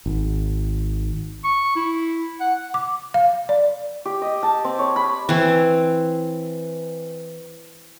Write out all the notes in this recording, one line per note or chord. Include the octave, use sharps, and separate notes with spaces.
G#1
C#6
E4
F#5
D6
F5
D5
G4
D#5
A5
C4
C#5
B5
E3 C4